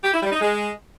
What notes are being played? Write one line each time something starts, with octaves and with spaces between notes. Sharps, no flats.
G4
E4
G3
D#4
G#3